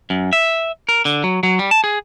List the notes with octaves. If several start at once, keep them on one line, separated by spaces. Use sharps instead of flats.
F#2
E5
A#4
D3
F#3
F#3
G3
A5
G#4